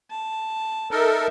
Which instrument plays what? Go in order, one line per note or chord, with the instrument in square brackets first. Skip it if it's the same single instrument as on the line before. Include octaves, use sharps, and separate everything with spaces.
[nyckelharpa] A5
[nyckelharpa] D#4 E5 [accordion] A4 A#4